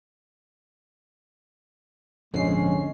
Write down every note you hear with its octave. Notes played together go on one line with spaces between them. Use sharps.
A#1 F2 G#2 D3 G#3 C#4 C7